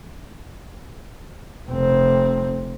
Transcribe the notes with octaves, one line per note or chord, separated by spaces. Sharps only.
F1 C4